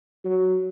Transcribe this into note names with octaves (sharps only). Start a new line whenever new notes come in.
F#3